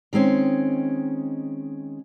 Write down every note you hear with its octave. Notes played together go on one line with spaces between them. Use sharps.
D#3 G#3 C4 C#4